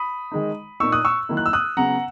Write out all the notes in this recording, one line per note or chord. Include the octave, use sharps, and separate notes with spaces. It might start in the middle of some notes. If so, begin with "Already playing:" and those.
Already playing: B5 D#6
D#3 G#3 D#4
A#2 A#3 D#4 C#6 E6
D#6 F#6
C#6 E6
D#3 F#3 A#3 E4
F#6
E6
D#6 F#6
C#3 F#3 B3 F#5 A#5